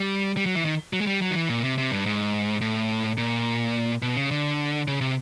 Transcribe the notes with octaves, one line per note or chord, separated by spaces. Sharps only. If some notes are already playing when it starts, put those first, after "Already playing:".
Already playing: G3
G3
F#3
E3
D#3
F#3
G#3
G3
F#3
D#3
E3
A#2
C3
C3
G2
G#2
A2
A#2
B2
C#3
D3
C#3
C3